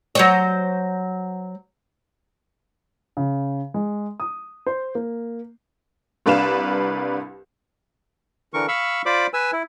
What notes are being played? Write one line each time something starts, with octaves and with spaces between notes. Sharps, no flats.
F#3 C5 C#5
C#3
G#3
D#6
C5
A#3
C2 D4 B4 F5 E7
D3 E3 A#4 C#6
F5 B5 C#6 E6
F4 C5 D5 B5 D6
B4 G#5 E6
E4